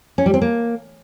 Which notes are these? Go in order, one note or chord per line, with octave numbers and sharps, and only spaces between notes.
C#4
G3
C4
A#3